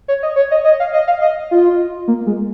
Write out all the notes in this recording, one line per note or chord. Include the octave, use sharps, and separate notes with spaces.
C#5
D#5
C#5
D#5
D#5
F5
D#5
F5
D#5
F4
A#3
G#3